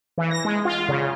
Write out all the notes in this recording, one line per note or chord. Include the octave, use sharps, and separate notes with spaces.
E3
A#6
G#3
F4
C#3